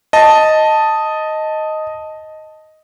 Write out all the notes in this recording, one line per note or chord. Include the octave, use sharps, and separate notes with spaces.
D#5 A5